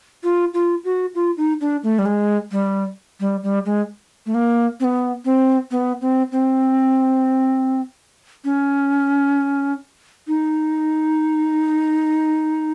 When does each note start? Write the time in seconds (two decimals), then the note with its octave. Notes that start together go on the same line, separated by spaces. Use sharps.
0.24 F4
0.54 F4
0.85 F#4
1.15 F4
1.37 D#4
1.61 D4
1.83 A3
1.99 G3
2.06 G#3
2.52 G3
3.20 G3
3.43 G3
3.66 G#3
4.26 A3
4.34 A#3
4.80 C4
4.84 B3
5.25 C4
5.71 B3
6.01 C4
6.32 C4
8.45 C#4
10.28 D#4